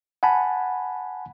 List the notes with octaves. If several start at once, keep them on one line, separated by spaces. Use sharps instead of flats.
F#5 G#5 A5 B5